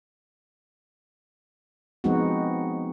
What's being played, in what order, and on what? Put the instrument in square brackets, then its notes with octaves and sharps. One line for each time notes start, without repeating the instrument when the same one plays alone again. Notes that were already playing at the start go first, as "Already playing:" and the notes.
[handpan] F3 G#3 B3 C4 D#4 F#4